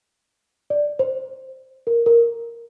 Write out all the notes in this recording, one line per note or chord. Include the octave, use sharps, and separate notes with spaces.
D5
C5
A#4
A#4